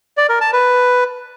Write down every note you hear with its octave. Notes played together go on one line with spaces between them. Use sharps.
D5
A#4
A5
B4